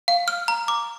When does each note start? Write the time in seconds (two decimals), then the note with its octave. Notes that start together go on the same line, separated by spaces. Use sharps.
0.08 F5
0.28 F6
0.48 A#5
0.68 D6